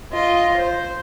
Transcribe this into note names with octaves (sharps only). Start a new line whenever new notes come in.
F4 D#5
C5